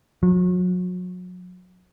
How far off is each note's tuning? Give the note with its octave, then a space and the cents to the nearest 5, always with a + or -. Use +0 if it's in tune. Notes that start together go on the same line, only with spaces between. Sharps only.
F#3 -35